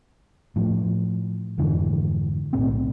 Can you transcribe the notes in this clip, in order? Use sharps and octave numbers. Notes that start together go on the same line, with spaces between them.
A2 F3
F2 G#2 D3 E3
B1 A2 C4